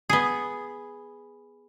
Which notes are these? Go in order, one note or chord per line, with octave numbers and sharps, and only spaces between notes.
B3 G#4